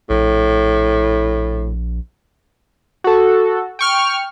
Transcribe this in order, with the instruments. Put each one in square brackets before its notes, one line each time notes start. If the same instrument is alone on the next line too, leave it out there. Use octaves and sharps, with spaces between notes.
[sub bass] A#1 [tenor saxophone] A2
[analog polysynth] F#4 A4
G5 C#6 F6